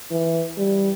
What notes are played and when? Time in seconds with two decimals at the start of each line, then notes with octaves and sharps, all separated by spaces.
0.11 E3
0.58 G3